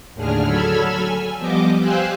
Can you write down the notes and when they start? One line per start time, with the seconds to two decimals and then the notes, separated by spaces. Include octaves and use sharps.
0.14 D#2 A2 D3 D4 G#4 F6
0.46 F#3 A4 B5 E6 F6 G#6
1.00 G#5
1.37 F3 G3 B3 D#5 D6
1.80 G4 C5 F5 G#5 E6 F#6